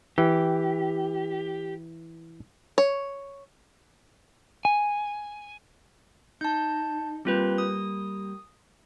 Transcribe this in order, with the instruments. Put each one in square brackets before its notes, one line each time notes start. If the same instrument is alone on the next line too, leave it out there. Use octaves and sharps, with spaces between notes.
[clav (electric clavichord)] E3 [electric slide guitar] G4
[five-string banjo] C#5
[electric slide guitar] G#5
[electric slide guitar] D#4 [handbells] A5 G6
[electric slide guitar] G3 A#3 G4 [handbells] C4 F4 B4
[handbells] D#6